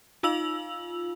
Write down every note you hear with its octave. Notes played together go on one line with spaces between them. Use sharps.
D#4 F4 F5 E6 F7 F#7